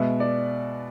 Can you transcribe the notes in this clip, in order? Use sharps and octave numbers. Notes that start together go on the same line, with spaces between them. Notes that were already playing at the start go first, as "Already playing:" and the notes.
Already playing: B2 G#3 B3 E5
D5